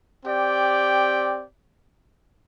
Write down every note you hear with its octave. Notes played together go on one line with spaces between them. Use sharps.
C4 G4 D5 G5